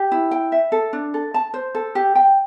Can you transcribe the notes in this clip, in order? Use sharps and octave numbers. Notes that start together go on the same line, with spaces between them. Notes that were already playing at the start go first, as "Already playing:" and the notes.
Already playing: G4
E4
G5
E5
A4
D4
A4
A5
C5
A4
G4
G5